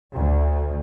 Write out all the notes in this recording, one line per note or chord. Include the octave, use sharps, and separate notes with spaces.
D2